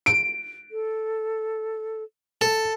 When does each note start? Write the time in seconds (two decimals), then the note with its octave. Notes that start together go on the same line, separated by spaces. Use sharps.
0.06 D7
0.71 A4
2.41 A4